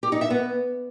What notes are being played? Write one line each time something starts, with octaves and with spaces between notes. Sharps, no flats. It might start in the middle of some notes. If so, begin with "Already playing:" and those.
G4
D#4
E5
B3